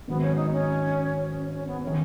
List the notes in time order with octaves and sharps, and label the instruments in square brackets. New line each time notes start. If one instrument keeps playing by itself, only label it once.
[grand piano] G#1 G#2 D#3 F#3 [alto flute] B3
[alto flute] C#4
D#4
C#4
C#4
C#4
B3
[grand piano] D#3 [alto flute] C#4